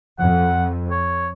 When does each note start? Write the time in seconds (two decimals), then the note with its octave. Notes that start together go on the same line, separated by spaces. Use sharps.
0.19 F2 F#5
0.91 C#5